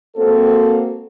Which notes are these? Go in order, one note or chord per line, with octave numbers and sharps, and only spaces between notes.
G#3 A#3 C4 F#4 A4